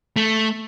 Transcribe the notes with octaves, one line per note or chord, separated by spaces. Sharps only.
A3